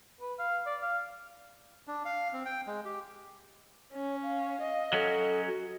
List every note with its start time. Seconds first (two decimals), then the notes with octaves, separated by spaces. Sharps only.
0.21 B4
0.39 F5
0.66 D5
0.82 F5
1.87 D4
2.05 F5
2.33 C4
2.45 G5
2.67 G#3
2.85 G4
3.93 C#4 C#5
4.23 F5
4.61 D#5
4.93 F#3 C#4 A4
5.47 F#4